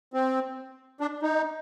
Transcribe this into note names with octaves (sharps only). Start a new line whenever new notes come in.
C4
D4
D#4